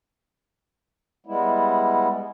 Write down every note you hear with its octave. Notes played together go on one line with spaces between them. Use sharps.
G3 G#3 B3 E4